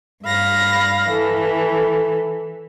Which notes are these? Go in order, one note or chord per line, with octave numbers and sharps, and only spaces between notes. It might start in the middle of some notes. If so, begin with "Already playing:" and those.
G2 F5 B5 A#6
E3 A4